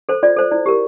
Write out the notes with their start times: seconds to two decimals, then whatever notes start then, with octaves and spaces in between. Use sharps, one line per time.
0.09 A4 C5
0.23 F4 D5
0.37 A4 C5
0.51 E4 D5
0.66 G4 A#4